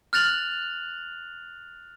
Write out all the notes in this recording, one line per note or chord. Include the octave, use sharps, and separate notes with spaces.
F6 F#6 A6 F7 F#7